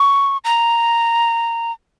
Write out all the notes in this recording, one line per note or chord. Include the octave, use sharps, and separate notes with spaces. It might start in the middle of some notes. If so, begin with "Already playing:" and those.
Already playing: C#6
A#5